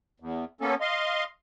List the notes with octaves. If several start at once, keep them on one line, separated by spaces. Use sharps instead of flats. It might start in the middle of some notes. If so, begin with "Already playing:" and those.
E2
A#3 B3 C#4 A4
D#5 F5 C6